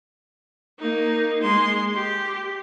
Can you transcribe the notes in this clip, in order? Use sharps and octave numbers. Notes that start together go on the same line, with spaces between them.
A#3 D#4
G#3 C6
G4